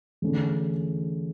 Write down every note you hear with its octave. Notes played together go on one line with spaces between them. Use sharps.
E2 D3 A3 C#4